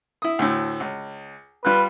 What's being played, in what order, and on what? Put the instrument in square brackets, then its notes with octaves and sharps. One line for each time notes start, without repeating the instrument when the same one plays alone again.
[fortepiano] E4 D#6
D2 A2
C#2
[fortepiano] G3 F4 F#6 [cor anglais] B4